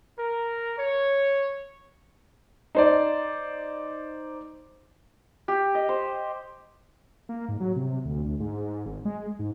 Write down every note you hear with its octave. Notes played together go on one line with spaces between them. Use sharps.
A#4
C#5
D#4 C5 D5
G4
D#5
C5
A#3
G#2
F#3
C3
D2
D2
G#2
G#1
G#3
G#2